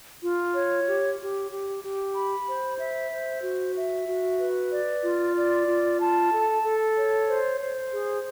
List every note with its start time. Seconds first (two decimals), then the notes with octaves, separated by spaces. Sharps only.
0.23 F4
0.56 C#5
0.87 G4
1.20 G4
1.51 G4
1.83 G4
2.16 B5
2.48 C5
2.79 E5
3.12 C5
3.43 F#4
3.75 E5
4.08 F#4
4.39 B4
4.71 D5
5.03 F4
5.36 D5
5.67 F4
5.99 A5
6.32 A4
6.64 A4
6.96 C#5
7.28 C5
7.60 C5
7.92 G#4